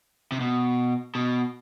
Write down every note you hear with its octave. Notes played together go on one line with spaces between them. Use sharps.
C3
B2
B2